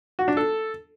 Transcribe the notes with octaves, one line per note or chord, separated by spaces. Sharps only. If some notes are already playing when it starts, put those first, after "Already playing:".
F#4
D4
A4